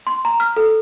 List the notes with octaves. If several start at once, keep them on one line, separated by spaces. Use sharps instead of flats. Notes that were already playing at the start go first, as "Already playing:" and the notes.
C6
A#5
F6
A4